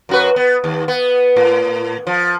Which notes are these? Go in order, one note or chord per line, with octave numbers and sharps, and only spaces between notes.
F#2 F#4 B4
B3
D#2
B3
A2
F3